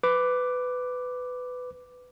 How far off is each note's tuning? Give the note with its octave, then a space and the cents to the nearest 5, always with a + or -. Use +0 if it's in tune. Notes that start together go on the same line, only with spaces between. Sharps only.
B4 +15 D6 +0